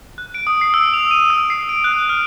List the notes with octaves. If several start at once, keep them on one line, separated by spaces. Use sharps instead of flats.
F#6
D7
D#6
C7
E6
F7
D#7
E6
C7
D7
F#6
F6